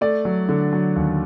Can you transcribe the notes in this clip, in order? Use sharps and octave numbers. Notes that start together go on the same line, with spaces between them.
A3 D5
F#3
D3
F#3
D#2